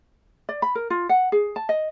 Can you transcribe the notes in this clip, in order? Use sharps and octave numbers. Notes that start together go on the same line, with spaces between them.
D5
B5
A#4
F4
F#5
G#4
A5
D#5